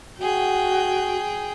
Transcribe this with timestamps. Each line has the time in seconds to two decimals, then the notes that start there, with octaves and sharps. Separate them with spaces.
0.19 F#4 G#4 G5